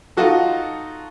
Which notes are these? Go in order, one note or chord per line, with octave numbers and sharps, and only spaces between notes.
D#4 F4 F#4 A4